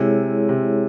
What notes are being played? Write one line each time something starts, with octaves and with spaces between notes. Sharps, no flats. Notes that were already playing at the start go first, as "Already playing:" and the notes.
Already playing: C3 G#3 E4 G#4 C#5
C3